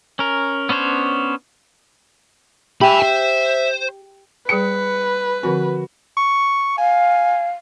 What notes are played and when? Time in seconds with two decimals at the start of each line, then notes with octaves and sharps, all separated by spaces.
0.19 C#4 A#4
0.69 B3 C#4 D4 C5 C#5
2.81 G4 E5 G#5 B5
3.03 C5
4.49 G3 G#4 B4 G5 C#7
5.43 D3 F3 C4 F#4
6.17 C#6
6.78 F5 G#5